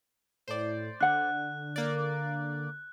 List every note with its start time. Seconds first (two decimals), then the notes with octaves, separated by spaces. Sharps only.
0.48 A2 C5 D5
1.01 D3 D4 F#5 F#6
1.76 A#3 D5